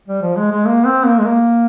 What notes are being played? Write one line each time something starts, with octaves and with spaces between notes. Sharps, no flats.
G3
F3
G#3
G#3
A#3
C4
A#3
G#3
A#3